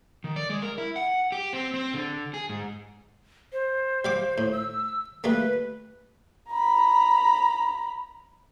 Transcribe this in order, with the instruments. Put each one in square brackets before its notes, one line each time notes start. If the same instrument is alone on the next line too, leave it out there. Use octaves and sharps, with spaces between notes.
[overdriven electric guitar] D#3
D5
G#3
A#4
E4
F#5
G4
C4
C4
D3
G#4
G#2
[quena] C5
[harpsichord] G3 F5 D6
A2
[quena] E6
[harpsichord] G3 A3 A#3 [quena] B4
[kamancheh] A#5 B5